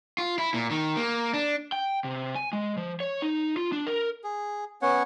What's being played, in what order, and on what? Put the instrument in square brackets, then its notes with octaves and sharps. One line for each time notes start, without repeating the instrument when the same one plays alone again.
[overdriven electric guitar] F4
E4
A#2
D#3
A#3
D4
[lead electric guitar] G5
C3
G#5
G#3
F3
C#5
D#4
F4
D4
A#4
[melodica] G#4
B3 C#4 C#5 F#5